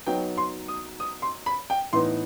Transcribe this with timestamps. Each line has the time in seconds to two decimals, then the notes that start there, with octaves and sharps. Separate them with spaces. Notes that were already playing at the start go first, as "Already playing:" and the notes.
0.07 F#3 B3 D#4 G5
0.37 C6
0.68 D#6
1.00 D#6
1.22 C6
1.46 B5
1.70 G5
1.93 A2 E3 B3 D#4 C6